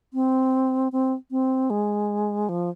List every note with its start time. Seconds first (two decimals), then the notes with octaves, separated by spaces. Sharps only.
0.14 C4
0.92 C4
1.31 C4
1.70 G#3
2.49 F3